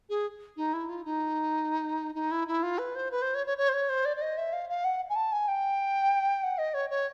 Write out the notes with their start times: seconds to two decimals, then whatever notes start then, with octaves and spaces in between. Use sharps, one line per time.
0.09 G#4
0.57 D#4
0.74 E4
0.89 F4
1.05 D#4
2.15 D#4
2.31 E4
2.48 E4
2.63 F4
2.78 B4
2.95 C5
3.11 B4
3.22 C5
3.35 C#5
3.47 C#5
3.58 C#5
3.69 C5
3.73 C#5
3.89 C5
4.05 D5
4.17 D5
4.21 D#5
4.37 E5
4.53 F5
4.69 F5
4.85 F#5
5.09 G#5
5.16 A5
5.32 G#5
5.48 G5
6.43 F#5
6.58 D#5
6.74 C#5
6.90 C#5